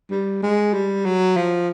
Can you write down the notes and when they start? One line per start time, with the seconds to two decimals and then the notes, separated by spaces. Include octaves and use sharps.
0.11 G3
0.43 G#3
0.73 G3
1.05 F#3
1.37 F3